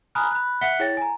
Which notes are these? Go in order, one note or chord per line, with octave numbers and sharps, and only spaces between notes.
G#5 A#5 B5 D#6 F6 F#6
B5 F#6
E5 F#5 F#6 B6 C#7 G7
E4 G#4 C#5 G5 A6 A#6
G#5 A#5